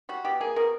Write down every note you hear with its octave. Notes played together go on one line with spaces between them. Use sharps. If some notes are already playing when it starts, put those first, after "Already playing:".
G3 F#4
B2 G4
A#3 G#4
B2 A#4